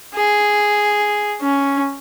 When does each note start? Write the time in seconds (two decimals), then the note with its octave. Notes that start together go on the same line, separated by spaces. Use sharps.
0.15 G#4
1.41 C#4